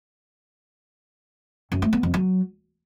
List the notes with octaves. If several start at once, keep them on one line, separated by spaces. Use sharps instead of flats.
F#2
A3
B3
F2
F#3